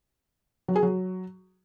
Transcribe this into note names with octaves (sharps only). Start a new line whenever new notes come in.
F#3
G#4
F#3